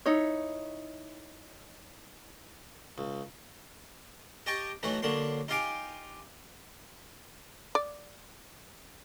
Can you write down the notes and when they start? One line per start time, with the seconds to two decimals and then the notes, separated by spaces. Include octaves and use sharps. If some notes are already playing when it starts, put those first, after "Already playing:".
0.06 D#4 E4 C#5
2.98 C#2
4.46 G4 D#5 G5 A5 C#6
4.83 E3 F#3 A3 D#4 F#4
5.02 D3 F#3 A#3 C6
5.48 D#4 F4 G4 F5 G#5 D6
7.75 D5